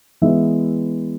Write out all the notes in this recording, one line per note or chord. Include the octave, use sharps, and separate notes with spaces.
E3 G#3 B3 E5